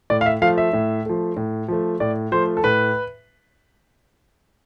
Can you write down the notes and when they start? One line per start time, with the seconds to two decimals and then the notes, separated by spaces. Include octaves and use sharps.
0.10 A2 D5
0.21 F5
0.26 E5
0.42 F3 A3 F5
0.58 E5
0.73 A2
1.06 F3 A3
1.36 A2
1.68 F3 A3
2.00 A2 D5
2.32 F3 A3 C5
2.57 A4
2.64 A2 B4